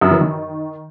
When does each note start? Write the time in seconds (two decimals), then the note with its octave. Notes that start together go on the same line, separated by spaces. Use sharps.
0.01 F#2
0.11 E3
0.21 D#3